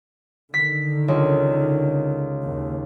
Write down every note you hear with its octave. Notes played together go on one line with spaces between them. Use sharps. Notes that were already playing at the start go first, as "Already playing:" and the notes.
D3 D#3 B6
C#2
D#2